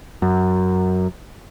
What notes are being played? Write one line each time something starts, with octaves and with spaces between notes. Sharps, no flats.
F#2